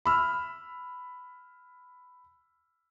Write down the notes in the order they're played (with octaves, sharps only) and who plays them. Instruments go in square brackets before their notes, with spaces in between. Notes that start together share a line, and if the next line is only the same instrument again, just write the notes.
[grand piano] B5 E6 F6